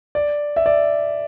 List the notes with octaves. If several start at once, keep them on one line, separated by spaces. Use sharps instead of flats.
D5
E5
D5